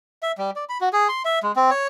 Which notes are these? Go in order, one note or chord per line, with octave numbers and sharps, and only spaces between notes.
E5
G3
D5
B5
F#4
G#4
C6
E5
G#3
C4
C#5